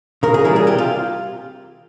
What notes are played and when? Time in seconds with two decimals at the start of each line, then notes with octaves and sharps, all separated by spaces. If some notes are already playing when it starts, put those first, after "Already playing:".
0.23 C#3 A#4
0.34 G#4
0.44 E3 G3 A#4
0.56 G#4
0.67 C3 G4
0.78 F4